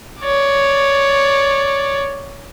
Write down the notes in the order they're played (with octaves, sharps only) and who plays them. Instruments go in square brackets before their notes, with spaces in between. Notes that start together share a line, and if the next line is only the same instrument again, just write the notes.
[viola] C#5 D5